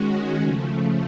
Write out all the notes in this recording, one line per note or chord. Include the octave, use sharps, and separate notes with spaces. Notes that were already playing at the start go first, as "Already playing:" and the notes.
Already playing: D#3 G#3 C#4 F#4
C#3 F3 A3